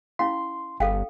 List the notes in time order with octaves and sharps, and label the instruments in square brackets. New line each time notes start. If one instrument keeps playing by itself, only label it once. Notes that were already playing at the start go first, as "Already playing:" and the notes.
[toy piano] C#4 E4 F5 [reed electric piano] C6
[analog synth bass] G1 [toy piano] A4 F5 G5